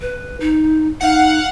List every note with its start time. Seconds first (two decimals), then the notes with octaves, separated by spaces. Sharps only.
0.01 B4
0.40 D#4
1.01 D#4 F5 F#5